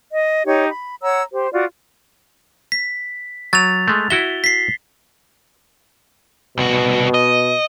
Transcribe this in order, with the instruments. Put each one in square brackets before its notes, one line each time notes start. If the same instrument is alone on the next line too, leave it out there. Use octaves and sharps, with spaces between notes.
[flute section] D#5
D#4 G4 C#5
B5
C#5 F#5 A#5 E6
G4 C5
F4 F#4 D5
[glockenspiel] B6
[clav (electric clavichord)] F#3 [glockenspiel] A6 F7
[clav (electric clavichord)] G#3 A3
[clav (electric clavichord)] E4 F#4 E5 [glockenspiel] G7
[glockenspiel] B6 C7
[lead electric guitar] C2 F#4 [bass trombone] B2
[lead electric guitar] D#5